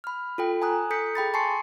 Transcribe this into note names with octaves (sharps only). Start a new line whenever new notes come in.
B5 F6
F4 A4 G5
G#5 A#5 D#6 F#6
A4 D#6 G6 B6 C#7
G#4 G5 B5 A6
G#5 A5 C6 C#6 C7 C#7